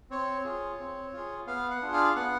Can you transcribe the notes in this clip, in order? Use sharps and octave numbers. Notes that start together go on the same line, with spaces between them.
C4 C#5
F4 G#4
C4
F4 G#4
B3 F5
F#5
D4 F4 G#4
F5
B3 F#5